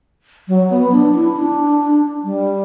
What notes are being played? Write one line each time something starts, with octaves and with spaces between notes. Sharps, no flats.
F#3
B3
D4
E4
D4
G3